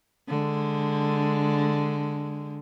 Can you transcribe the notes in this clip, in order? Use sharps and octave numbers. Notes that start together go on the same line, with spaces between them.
D3 G#3